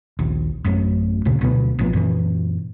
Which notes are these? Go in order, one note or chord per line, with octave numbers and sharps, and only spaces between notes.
A#1 D#2
A1 F#2 A2
D2 A#2 C#3
D2 B2 F#3 B3
A#1 A2 F3 B3
F#2 A#2 D3 E3